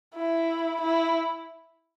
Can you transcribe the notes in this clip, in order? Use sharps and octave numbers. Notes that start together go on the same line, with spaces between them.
E4
E4